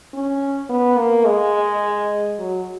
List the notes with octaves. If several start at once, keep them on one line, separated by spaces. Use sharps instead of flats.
C#4
B3
A#3
G#3
F#3